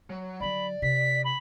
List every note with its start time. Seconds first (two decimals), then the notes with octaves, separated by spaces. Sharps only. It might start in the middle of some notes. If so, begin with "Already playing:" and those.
0.10 F#3
0.40 D3 F#3 D5 B5
0.82 C3 B6
1.24 B5